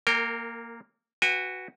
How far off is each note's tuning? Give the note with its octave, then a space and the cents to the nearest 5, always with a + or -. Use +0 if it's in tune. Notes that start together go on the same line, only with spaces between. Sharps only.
A#3 +0 A#4 -30 G5 +20
F#4 +0 B4 +0 G#5 -45